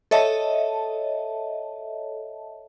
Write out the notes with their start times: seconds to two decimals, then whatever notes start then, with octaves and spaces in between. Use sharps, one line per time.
0.11 A4 C#5 D#5 E5 A5